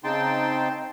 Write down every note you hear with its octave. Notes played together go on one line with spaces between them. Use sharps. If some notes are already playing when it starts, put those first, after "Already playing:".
C#3 C4 D#4 G5 A5 C6